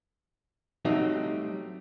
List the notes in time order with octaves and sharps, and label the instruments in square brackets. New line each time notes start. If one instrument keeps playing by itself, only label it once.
[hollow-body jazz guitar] F#3 G3 A3 C4 D4 D#4